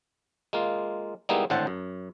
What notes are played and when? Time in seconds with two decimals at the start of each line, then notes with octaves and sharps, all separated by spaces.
0.53 G#3 A#3 F4
1.29 G3 G#3 A#3 B3 D#4 E4
1.50 G#1 A2 D3 C5 F#5 A5
1.67 F#2